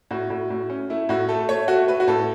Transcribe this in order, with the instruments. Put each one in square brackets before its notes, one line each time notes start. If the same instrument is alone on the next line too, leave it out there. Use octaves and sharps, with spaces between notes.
[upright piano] A2 F#4
A2
A2
C#4
A3 E4
A2 F#4
A3 A4
A3 C#5
A3 F#4
A3 B4
F#4
A2 A4